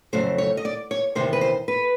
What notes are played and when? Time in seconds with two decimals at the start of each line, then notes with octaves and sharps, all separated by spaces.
0.13 F2 C#3 F#3 A3 C5
0.38 C#5
0.57 D#5
0.65 D5
0.91 C#5
1.15 E2 C3 D#3 C5
1.33 B4
1.41 C5
1.68 B4